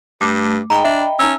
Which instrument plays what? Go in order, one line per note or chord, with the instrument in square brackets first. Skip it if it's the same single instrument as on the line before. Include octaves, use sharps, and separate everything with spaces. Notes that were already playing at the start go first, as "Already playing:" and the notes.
[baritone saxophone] G2 [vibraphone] A3 [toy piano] D6
[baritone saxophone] G#2 [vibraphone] D#5 G5 B5 [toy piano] A#5
[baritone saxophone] D4 [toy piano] E5
[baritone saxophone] C#4 [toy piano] D#4 A#5 E6